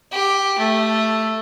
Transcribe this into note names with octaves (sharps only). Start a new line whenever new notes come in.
G4
A3